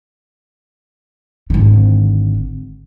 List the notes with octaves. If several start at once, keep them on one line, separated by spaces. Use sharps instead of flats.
G#1 D3